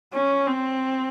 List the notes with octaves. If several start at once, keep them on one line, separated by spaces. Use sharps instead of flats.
C#4
C4